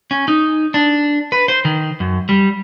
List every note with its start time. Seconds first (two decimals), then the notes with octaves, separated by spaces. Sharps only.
0.11 C#4
0.28 D#4
0.74 D4
1.32 B4
1.48 C5
1.65 D#3
2.00 F#2
2.29 G3